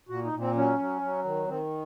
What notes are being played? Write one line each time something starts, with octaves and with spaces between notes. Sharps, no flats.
A#2 F#4
D#4
A#2
C4
F#3 C#4
F#3
F#3
D#3
D#3 C4